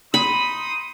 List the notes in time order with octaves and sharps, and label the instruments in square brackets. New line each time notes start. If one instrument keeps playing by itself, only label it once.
[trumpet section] D#4 C6 D#6 [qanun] B5